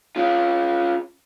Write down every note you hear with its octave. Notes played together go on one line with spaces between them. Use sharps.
C#4 F4